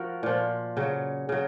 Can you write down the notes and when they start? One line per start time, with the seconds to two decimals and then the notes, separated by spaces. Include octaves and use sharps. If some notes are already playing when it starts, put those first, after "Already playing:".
Already playing: F3 F#4 A#4
0.23 A#2 F3
0.77 C#3 F#3
1.29 C#3 F#3